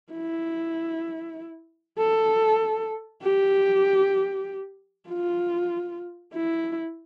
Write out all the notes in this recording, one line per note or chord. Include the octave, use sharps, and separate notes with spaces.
E4
A4
G4
F4
E4